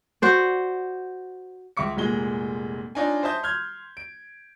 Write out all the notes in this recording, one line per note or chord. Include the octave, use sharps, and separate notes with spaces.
F#4 C5 D5
C#2 E5 D6 C#7
F1 A#2 G#3 G7
D4 D#4 F4 C#5 G#5
C5 D#5 E5 A5 D#6 G6
C6 F6 G6 G#6
D7